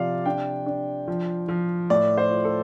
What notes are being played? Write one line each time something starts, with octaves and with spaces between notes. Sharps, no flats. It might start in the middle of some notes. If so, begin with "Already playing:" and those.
Already playing: C3 F3 D5 F5
D4 G5
D4
F3
F3
A2 D5
C5
F4
A4